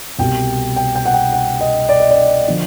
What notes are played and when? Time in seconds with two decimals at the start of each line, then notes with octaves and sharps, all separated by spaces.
0.19 C2 B2 G3 G5
0.76 G5
0.95 G5
1.05 F#5
1.14 G5
1.33 F#5
1.61 D#5
1.89 D5
2.00 D#5
2.11 D5
2.48 D3 F3